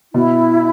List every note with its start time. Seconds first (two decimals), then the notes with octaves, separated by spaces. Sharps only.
0.14 B2 E4